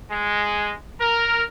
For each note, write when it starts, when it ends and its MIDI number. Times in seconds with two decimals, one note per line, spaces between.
0.11 0.72 56
1.00 1.43 70